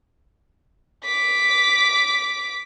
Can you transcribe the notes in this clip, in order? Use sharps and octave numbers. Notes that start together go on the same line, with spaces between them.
D6 B6